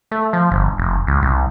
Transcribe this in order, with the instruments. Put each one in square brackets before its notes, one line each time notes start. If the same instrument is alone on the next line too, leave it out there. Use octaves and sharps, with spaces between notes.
[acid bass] A3
F3
G1
F1
C#2
C2